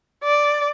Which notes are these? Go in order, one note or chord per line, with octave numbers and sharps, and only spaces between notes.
D5